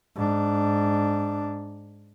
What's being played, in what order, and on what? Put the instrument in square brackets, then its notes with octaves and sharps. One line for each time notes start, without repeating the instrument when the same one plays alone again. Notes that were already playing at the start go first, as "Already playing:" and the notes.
[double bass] G#2 D4